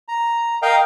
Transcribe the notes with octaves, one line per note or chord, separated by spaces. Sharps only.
A#5
A#4 D#5 F5 G5 A#5